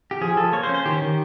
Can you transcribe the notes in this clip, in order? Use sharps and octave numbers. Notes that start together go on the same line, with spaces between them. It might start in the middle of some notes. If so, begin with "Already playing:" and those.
G4
F3 G#4
F3 A4
A#3 C#5
C5
C#4
C5
D#3 G4
D#3